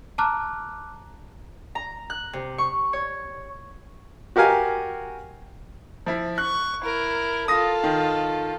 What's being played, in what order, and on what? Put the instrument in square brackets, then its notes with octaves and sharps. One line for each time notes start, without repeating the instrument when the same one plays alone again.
[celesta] A5 A#5 D6 F6 F#6
[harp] A#5
F#6
C3
C#6
C#5
[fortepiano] F#4 G4 A#4 F5 G#5
[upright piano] F3 E4
[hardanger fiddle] C#6 [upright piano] F#6
[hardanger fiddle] E4 A#4
[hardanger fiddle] F4 A4 [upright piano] D#6 A#6
[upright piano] D#3